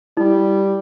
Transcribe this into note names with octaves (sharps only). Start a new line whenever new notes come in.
G3 E4